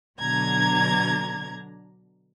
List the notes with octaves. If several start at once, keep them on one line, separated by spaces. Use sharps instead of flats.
B2 D3 F#3 D4 A#5 G#6